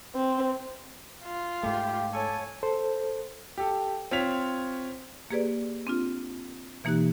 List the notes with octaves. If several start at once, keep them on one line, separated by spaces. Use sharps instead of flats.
C4
F4
G#2 A3 G4 F5
A4 C#5 G#5
A4 C5
G4 A4
C4 F4 C#5 C#6 B6 F7
A#3 G4 G#4 B4 D5
C4 D4 F4
B2 E3 A#3 D#4 G4 F#6